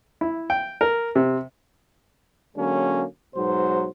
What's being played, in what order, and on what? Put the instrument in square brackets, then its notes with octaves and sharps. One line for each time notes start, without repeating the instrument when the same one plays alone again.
[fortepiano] E4
G5
A#4
C3
[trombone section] D3 F#3 G#3 A#3 C#4
B1 G#2 B2 F#3 C5